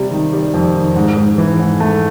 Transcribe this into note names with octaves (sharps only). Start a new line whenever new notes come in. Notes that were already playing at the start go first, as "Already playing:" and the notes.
Already playing: C3 G3
D#3
G3
F2
D#3
G#2
G#2
E3
G#2
A3